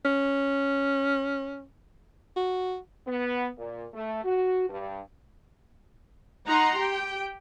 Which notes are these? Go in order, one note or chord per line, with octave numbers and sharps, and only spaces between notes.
C#4
F#4
B3
A#2
A3
F#4
G2
D#4 F#5 A#5 C6
G4 G5